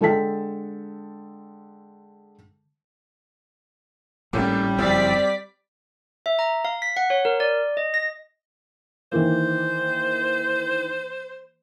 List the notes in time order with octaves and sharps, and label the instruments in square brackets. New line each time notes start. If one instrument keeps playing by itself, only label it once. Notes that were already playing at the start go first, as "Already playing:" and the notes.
[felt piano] D3 G#3 A4 G5 A5 B6
[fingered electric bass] G#1 A2 C#4 [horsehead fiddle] G3 [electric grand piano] A3 A#3 G4
[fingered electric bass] F#1 F2 [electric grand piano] C4 [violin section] D5 B6
[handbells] E5
A#5
F5
B6
F#5
C#5
A#4
D5
D#5
A#6
[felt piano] D#3 E3 A#3 [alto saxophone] C5